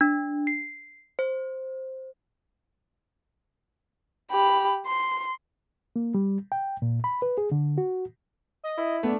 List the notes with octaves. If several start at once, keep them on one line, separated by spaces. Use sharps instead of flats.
D4
C7
C5
G4 B5
C6
A#3
G3
G5
A#2
B5
B4
G#4
D3
F#4
D#5
E4
A3 B3 D4